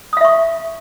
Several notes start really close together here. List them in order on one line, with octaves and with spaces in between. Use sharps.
D#6 F5 E5 C#6